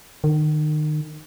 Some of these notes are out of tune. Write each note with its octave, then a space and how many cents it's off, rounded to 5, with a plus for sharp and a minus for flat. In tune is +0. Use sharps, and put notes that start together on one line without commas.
D#3 -35